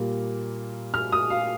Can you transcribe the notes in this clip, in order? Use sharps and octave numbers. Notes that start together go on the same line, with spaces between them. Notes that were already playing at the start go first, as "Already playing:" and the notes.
Already playing: A#2 G3 A#3
F6
D#6
F5